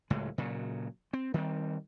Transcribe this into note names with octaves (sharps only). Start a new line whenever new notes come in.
F#1 C#2 A2 G#3
A#2 C#3 F#3
C4
D#3 G3 A#3 C4